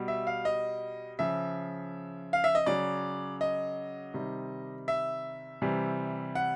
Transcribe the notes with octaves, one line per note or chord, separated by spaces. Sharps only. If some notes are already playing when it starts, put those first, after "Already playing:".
Already playing: B2 G3
E5
F5
D#5
C#3 F3 E5
F5
E5
D#5
C#3 F#3 D5
D#5
C3 D#3 G3
E5
C3 E3 G3
F#5